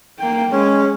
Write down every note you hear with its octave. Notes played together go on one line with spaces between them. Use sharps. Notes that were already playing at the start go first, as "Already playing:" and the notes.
A#3 G5
G#3 C#4